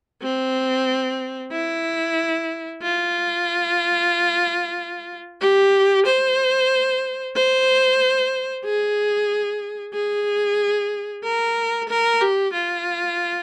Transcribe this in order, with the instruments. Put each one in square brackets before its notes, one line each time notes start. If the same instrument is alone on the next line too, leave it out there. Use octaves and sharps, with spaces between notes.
[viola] C4
E4
F4
G4
C5
C5
G#4
G#4
A#4
A#4
G4
F4